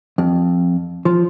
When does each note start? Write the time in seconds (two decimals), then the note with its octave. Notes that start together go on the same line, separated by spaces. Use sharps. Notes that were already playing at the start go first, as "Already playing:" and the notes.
0.18 F2
1.05 F3